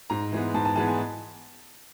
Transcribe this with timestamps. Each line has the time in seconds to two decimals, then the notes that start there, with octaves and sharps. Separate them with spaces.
0.10 G#2 A#5
0.32 E3 G#3 B3
0.54 G#2 A5
0.65 A5
0.75 E3 G#3 B3 A5
0.87 G#5